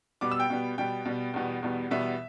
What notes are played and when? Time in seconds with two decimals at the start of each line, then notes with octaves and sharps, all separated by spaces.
0.21 B2 G3 B3 D6
0.31 E6
0.40 G5
0.50 B2 G3 B3
0.78 B2 G3 B3 G5
1.05 B2 G3 B3
1.34 E2 B2 G3 B3
1.63 E2 B2 G3 B3
1.91 E2 B2 G3 B3 E5